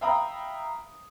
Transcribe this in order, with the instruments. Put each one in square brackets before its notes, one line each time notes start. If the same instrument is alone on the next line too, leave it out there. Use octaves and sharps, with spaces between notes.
[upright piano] E5 F5 G5 A#5 B5 D#6